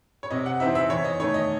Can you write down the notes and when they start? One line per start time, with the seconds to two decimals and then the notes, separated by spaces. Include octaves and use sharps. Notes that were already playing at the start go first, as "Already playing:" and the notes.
0.23 C#5
0.31 C3 D#5
0.46 F#5
0.60 E3 C4 D#4 E5
0.75 E5
0.90 E2 C#5
1.05 D#5
1.19 D#3 A3 C#5
1.34 D#5